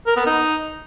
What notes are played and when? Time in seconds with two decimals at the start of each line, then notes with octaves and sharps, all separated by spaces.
0.07 A#4
0.16 B3
0.26 D#4